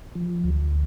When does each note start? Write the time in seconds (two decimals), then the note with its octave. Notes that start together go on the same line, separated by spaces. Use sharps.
0.15 F3
0.44 D2